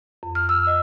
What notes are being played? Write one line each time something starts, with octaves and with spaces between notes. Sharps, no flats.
F2
F6
E6
D#5